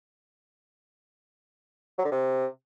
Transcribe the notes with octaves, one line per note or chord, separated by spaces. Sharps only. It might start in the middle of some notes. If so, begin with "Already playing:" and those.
F#3
D3
C3